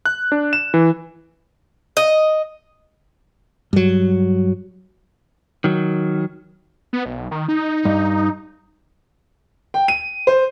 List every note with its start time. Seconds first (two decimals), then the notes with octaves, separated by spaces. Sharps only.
0.05 F#6
0.32 D4
0.53 E7
0.74 E3
1.97 D#5
3.73 G2 F#3
5.64 D#3 F#3
6.93 B3
7.05 B1
7.31 D#3
7.48 D#4
7.85 G2
9.74 G5
9.88 D#7
10.27 C5